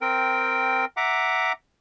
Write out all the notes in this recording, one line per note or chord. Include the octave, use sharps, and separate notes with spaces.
C4 A#4 G5
E5 F#5 A#5 D6